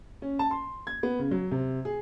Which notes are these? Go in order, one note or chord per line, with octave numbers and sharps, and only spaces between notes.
C#4
A5
C6
G#6
B3
C#3
F#3
C3
G#4